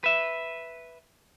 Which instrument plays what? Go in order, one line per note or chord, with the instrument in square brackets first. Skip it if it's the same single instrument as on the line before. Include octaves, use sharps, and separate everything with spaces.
[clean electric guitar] B4 E5